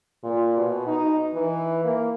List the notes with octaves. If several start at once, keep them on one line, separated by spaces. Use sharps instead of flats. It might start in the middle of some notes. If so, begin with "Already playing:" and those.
A#2
B2
D#4
E3
A#3